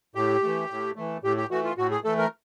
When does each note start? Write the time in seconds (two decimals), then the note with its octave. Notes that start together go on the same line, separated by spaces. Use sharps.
0.15 A2 G4
0.43 E3 A3
0.70 A2
0.96 E3 A3
1.23 A2 G4
1.37 G4
1.51 E3 A3 F#4
1.64 F4
1.78 A2 F#4
1.91 G#4
2.04 E3 A3 A4
2.18 A#4